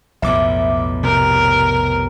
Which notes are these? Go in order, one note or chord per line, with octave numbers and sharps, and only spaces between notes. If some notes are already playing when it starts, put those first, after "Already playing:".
B1 F2 A2 E5 D6
C3 A#4